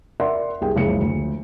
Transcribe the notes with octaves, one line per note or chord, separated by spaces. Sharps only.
A#4 D5 E5 F#5 C6
C2 G#4 G5
F#1 C#2 C#3 F3 G#4 C#7
D2